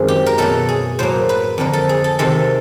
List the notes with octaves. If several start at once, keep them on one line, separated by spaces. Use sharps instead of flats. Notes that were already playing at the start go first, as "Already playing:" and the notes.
Already playing: F#2 D#3 G#3 C4
G4
A#4
B2 F#3 A3 A4
G#4
A2 F#3 A#3 C5
B4
F2 D3 F3 A#4
A4
G#4
A4
C3 D#3 G#3 C4 A4